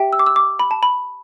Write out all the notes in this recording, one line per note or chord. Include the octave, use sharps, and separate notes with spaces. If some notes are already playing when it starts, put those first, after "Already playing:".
Already playing: G4 E5 G5
E6
D6
E6
D6
B5
A5
B5